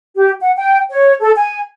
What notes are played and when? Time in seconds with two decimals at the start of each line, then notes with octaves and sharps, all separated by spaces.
0.15 G4
0.41 F#5
0.57 G5
0.91 C#5
1.21 A4
1.36 G#5